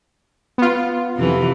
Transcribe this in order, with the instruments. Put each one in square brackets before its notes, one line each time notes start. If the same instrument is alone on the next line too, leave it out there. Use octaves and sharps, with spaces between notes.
[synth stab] B3 F4
[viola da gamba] F2 C3 E3